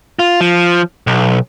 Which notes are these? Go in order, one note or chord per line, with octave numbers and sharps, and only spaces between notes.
F4
F3
B1